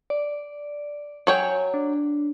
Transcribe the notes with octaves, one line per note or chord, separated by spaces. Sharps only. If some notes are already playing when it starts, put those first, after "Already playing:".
D5
F#3 C#5 G5 G#5
D4